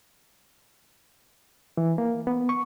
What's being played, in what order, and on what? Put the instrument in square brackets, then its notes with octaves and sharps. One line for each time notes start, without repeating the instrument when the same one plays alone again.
[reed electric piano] E3
A#3
B3
C#6